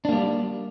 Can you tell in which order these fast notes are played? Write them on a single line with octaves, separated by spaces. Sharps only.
D4 A#3 G3